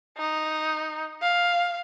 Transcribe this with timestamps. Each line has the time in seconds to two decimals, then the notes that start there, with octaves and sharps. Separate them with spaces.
0.18 D#4
1.22 F5